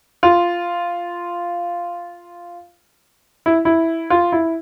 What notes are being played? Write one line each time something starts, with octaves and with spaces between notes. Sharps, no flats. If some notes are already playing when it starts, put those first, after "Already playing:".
F4
E4
E4
F4
E4